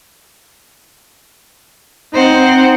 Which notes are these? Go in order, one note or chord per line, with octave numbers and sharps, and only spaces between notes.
C4 D#4 C5 F#5